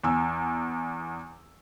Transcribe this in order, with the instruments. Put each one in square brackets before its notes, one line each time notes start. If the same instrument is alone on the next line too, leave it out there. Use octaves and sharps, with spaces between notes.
[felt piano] E2 G#5 E6